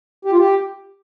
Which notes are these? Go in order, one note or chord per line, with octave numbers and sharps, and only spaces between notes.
G4
F4
G4